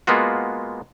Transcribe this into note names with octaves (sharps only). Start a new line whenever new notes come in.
G#3 A#3 B3 F4 F#4